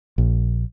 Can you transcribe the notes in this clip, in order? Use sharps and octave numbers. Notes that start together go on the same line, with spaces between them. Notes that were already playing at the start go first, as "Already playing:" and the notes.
A#1